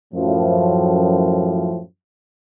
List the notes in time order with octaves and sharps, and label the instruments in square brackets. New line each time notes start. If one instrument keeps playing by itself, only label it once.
[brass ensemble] F#2 A2 F3